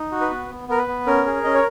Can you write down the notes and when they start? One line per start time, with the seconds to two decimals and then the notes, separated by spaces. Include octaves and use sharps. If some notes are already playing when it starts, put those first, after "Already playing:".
Already playing: D#4
0.11 F#4
0.21 B4
0.31 B3
0.50 B3
0.68 B3 A#4
0.78 B4
0.88 B3
1.07 C#4 A#4
1.26 G#4
1.44 C#4 D#5
1.54 C#5